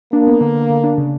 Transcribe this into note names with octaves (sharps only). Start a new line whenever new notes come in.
A#3 D4
B3
D3
D3
D3
D4
C#3